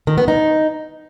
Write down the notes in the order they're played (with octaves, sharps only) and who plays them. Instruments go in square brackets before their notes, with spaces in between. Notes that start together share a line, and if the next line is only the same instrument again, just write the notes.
[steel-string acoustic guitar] D#3
B3
D#4